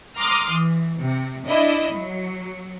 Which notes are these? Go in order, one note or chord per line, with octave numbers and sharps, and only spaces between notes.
A#5 C6 D6 D#6 F6
E3
C3
D4 E4 D#5
F#3